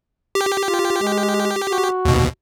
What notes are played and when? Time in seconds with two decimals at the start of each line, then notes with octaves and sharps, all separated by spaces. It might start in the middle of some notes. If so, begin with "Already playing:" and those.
0.35 G4
0.65 F4
1.02 G#3
1.70 F#4
2.05 D#2 B2